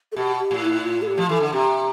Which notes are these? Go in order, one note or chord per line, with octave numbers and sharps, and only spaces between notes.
A4
B2 G4
G4
A2
E4
F4
A4
G4
F3
E3 A4
D3
C3 G4